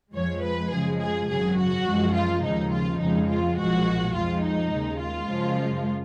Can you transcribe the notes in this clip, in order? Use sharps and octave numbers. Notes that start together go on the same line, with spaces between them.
F2 F3 G#3 C#5
B4
F#2 C#3 F3 G#3 G#4
G#4
G#1 F#2 C#3 F#3 G#4
F#4
F#2 F3 G#3
F4
D#2 C#3 F3 G#3 D#4
F4
F2 C#3 F3 G#3 D#4
F4
B1 A#2 F3 G#3 F#4
F2 F3 G#3 F4
D#4
D#2 C#3 G#3
F4
F#2 C#3 F3 G#3